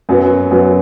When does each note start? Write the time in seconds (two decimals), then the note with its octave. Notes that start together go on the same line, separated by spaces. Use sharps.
0.09 F#2 F#3 B3
0.51 F#2 F#3 B3